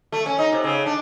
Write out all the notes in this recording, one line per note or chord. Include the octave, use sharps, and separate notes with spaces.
A3
C#4
D#4
C3
C#3
D4